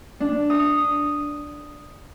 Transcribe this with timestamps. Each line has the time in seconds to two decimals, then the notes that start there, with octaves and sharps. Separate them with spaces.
0.20 D4
0.50 D#6